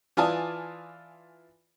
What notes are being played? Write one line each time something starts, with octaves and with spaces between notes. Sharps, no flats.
E3 F4 D5 G#5 A5 D#6